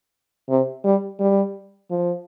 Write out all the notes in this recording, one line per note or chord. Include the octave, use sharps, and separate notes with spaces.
C3
G3
G3
F3